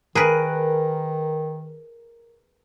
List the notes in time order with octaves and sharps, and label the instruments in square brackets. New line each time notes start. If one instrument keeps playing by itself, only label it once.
[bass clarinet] D#3 [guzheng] G#4 B4 [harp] A#4 F#6 D7